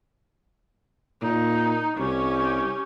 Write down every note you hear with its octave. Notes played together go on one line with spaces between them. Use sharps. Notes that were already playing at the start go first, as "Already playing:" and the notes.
A#2 D#4
C2 C#4 G4